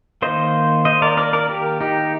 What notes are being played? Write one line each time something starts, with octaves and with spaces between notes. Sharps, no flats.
D#3 A#3 C5 D#5
C5 D#5
A#4 D5
A#4 D5
A#4 D5
G4 A#4
D#4 G4